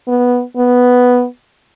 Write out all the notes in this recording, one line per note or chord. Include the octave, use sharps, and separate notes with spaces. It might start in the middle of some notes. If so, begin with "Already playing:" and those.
B3
B3